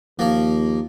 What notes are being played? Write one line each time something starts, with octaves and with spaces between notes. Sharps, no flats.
D#2 F3 A#3